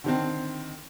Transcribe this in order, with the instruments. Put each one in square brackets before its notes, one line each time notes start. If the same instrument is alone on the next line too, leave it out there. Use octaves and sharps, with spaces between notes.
[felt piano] D3 D#3 C4